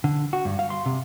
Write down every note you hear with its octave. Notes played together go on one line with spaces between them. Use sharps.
D3
F#4
G2
F5
C6
C3